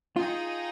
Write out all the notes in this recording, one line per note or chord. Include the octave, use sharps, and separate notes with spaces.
D#4 F4 G#4 D#5 G5